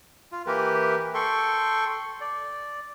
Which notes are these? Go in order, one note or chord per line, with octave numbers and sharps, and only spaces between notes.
F4
E3 A#3 G4 A#4 B4
A4 G5 C6 C#6
D5